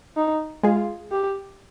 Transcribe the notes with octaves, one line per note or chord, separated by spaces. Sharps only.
D#4
G#3 F4 G#4
G4